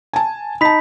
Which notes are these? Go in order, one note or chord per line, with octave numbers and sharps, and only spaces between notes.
G#5 A5
D#4 A5 B5 B6